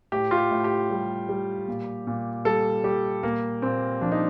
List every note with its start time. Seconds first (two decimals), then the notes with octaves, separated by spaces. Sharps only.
0.12 A2 G4
0.31 F4
0.37 G4
0.51 A2
0.64 G4
0.90 G3
1.29 G3
1.68 A#2
2.07 A#2
2.45 G3 A4
2.84 G3 G4
3.23 A#2 A#3
3.62 A#2 C4
4.01 F3 D4
4.12 D#4